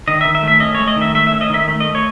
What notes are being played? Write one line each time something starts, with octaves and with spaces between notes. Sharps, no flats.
D#3 D#5
E5
D#3
E5
A3
E5
C#4 D#5
C#5
A3
D#5
D#3
E5
A3 E5
E5
C#4
D#5
D#3 E5
A3
D#5
A3
C#5